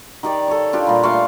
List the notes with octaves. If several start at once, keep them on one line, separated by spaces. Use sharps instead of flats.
D#3 G4 D5
A4 C#5
D4 F4 G4
A#2 G3
A3 F5 C6 C#6